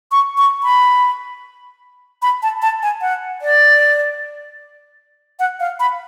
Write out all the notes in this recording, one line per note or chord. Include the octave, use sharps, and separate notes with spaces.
C#6
C#6
B5
B5
A5
A5
G#5
F#5
D5
F#5
F5
B5